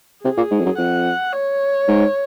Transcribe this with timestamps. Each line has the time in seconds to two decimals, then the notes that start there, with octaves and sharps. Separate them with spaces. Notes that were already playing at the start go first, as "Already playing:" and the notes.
0.23 C3 G#4
0.37 A#2
0.51 G#2
0.59 F2
0.65 F#2
0.78 F2 F#5
1.33 C#5
1.88 G#2